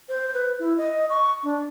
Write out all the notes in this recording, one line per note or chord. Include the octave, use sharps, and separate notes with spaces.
C5
B4
E4
D#5
C#6
D4